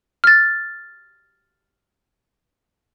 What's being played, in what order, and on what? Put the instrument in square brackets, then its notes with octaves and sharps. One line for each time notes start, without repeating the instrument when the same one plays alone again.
[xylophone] F6 A6